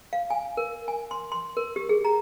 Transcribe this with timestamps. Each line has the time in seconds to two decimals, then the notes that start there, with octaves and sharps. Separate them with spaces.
0.13 F5
0.30 G#5
0.57 A#4
0.88 G#5
1.11 C6
1.32 C6
1.57 A#4
1.76 G4
1.89 G#4
2.05 A#5